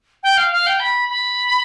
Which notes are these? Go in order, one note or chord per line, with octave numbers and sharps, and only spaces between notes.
G5
F5
F5
G5
B5
B5